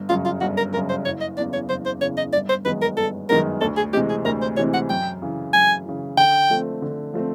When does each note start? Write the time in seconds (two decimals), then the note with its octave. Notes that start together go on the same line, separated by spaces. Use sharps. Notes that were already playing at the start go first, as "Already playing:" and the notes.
Already playing: G1
0.09 F#2 C#3 F4
0.25 F4
0.41 G1 F#4
0.57 A#4
0.74 F#2 C#3 A#4
0.89 C5
1.05 F#1 C#5
1.21 D#5
1.38 E2 C#3 D5
1.53 C#5
1.69 F#1 C5
1.86 C5
2.01 E2 C#3 C#5
2.17 D#5
2.33 G1 D5
2.49 C5
2.65 F#2 D#3 G#3 B3 B4
2.82 A#4
2.97 G1 A4
3.29 F#2 D#3 G#3 B3 A#4
3.61 D2 A4
3.77 G#4
3.93 C3 E3 G#3 C4 G4
4.10 G#4
4.25 D2 A#4
4.42 C5
4.57 C3 E3 G#3 C4 C#5
4.74 F#5
4.89 F#2 G5
5.22 C#3 E3
5.54 F#2 G#5
5.85 C#3 E3
6.17 D3 G5
6.50 F3 A3 C4
6.82 D3
7.14 F3 A3 C4